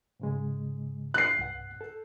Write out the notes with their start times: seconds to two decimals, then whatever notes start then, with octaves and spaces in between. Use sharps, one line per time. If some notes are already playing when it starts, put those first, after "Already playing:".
0.20 G#2 C#3 G#3
1.14 F#6 C7
1.37 C2 G2 F#5
1.81 A4